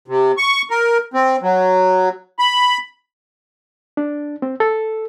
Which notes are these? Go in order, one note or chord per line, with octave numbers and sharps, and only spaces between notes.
C3
C#6
A#4
C4
F#3
B5
D4
C4
A4